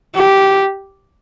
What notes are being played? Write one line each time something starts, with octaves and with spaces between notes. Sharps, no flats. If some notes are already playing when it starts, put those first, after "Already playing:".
G4